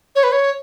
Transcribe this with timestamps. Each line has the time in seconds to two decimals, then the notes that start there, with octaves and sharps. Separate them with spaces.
0.15 C#5
0.23 B4
0.32 C#5